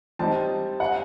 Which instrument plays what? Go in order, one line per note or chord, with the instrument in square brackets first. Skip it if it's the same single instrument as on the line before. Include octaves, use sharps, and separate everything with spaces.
[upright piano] G3 C4 D#4 [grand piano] A5
[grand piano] F#5